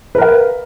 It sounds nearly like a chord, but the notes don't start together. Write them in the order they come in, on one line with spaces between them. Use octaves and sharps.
B4 A#4 F5